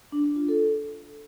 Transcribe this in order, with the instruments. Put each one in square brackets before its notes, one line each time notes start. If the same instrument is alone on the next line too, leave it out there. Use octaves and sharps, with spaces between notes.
[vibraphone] D4
D4
F4
A4